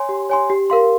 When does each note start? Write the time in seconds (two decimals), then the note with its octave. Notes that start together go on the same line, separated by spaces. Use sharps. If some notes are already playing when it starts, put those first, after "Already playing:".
Already playing: C#5 G#5 C6
0.09 G4
0.30 C#5 G#5 C6
0.50 G4
0.70 A#4 F5 C6